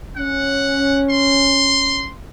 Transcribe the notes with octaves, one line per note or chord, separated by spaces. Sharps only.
C#4 F#5
C6